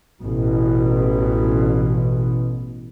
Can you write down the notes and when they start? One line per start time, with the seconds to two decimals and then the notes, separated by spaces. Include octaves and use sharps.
0.24 A1 B2